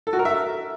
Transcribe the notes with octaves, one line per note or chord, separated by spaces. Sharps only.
A4
F#4
A#4
E5